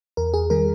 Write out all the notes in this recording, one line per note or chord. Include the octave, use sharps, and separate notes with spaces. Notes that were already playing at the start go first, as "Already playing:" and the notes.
E2 A#4
G#4
D#3 G3 A#4